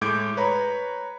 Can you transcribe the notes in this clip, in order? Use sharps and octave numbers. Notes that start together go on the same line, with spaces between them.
A2 G#3 D6 G6 G#6 D7
B4 C#5 A#5 B5